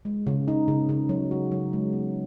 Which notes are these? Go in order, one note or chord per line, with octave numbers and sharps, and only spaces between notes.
G#3
C#3
D#4
C#3
C#3
F#3
F#4
F#3
G#3
B3